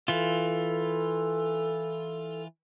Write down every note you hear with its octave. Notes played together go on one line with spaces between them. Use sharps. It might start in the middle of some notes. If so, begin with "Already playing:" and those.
E3 F4 A4